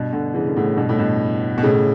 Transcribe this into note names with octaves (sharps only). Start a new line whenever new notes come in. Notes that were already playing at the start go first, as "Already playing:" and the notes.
Already playing: G2 B2
B2 D3
C#3 E3
D3
A2 C#3
G2 B2
A2
G2 B2
B2
A2 C#3